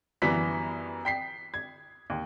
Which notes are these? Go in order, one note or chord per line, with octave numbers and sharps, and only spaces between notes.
F#2 E3 G3 B3 B6
G5 B6 C7
G#6
D#2